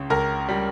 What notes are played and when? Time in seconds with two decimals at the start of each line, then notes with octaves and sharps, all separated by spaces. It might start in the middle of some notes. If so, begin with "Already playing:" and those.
Already playing: C#2 C#3
0.10 C#2 A#4
0.49 G3